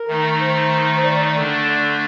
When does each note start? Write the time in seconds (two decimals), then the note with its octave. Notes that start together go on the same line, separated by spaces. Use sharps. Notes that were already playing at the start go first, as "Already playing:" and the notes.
Already playing: A#4
0.08 D#3 A3 D#4
0.41 C5
0.98 C5
1.04 D5
1.15 D5
1.26 D5
1.37 D3 A3 D4
1.69 D5